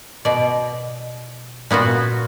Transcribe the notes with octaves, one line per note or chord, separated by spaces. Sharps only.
B2 D5
A#2 B3 F4 F#4